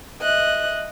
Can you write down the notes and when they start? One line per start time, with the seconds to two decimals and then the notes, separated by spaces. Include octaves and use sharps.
0.21 D#5 E5 F#6